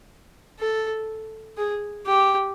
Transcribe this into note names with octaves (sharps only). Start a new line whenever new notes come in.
A4
G#4
G4